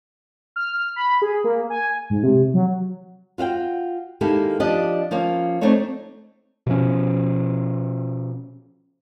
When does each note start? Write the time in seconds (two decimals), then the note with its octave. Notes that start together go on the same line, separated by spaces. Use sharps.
0.56 F6
0.96 B5
1.22 G#4
1.44 A#3
1.70 G#5
2.10 G#2
2.23 C3
2.54 F#3
3.38 F4 F#4 F5 G5
4.21 D#3 G#3 A#3 E4 G4 A4
4.60 F3 D4 G4 D5 D#5
5.11 F3 A#3 C#4 F4
5.61 A3 C4 D4 D#4 C#5
6.67 B2 F3 C#4